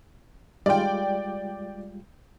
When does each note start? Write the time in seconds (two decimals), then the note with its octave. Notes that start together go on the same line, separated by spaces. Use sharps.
0.66 G3 G#3 F4 D5 G5